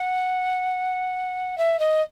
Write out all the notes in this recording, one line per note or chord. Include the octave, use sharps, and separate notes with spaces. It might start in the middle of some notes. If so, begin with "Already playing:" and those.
Already playing: F#5
E5
D#5